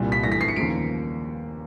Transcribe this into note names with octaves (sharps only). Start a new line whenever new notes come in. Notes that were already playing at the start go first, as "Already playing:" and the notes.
Already playing: C2 A#2 G3
B6
G2 E3 A3 A#6
B6
C7
C#7
D#2 C#3 F3 A#3 D7